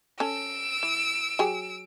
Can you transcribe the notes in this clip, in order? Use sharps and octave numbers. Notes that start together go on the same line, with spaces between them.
C#4 A4 E6 D7
E3
F#3 G4 G#4